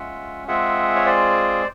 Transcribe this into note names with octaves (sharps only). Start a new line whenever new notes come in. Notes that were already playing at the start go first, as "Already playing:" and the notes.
Already playing: G#3 C#4 F4 E5 F#5
G#3 C4 F4 G#4 E5 F#5
C#5
C5 D5